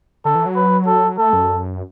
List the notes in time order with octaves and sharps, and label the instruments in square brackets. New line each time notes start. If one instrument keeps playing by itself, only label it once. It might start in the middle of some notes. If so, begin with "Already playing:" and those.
[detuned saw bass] D3 [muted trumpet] A4
[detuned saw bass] E3
F#3
[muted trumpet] B4
A4
[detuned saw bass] A3 [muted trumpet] A4
[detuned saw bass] F#2